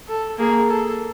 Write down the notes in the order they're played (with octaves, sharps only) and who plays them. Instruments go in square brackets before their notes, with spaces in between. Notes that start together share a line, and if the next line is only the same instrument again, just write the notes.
[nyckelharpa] A4
[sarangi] A#3 [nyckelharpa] G#4
[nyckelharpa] A4